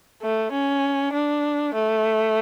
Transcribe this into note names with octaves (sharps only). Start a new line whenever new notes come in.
A3
C#4
D4
A3